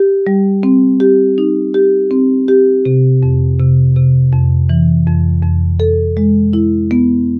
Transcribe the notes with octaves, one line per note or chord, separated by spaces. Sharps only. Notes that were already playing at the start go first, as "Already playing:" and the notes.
Already playing: G4
G3
C4
G4
D#4
G4
C4
G4
C3
F2
C3
C3
F2
E3
F2
F2
A4
G#3
E4
B3